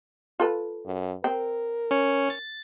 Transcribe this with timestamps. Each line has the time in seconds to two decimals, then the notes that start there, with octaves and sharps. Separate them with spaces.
0.40 F4 A4 B4
0.86 F#2
1.24 C4 A#4
1.91 C#4 C#5
2.30 A6